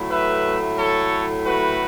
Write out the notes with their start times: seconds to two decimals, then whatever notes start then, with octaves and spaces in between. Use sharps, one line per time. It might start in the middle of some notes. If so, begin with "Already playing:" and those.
Already playing: A2 F#3 A3 E4
0.10 B4 E5
0.78 A4 C#5
1.46 F#4 B4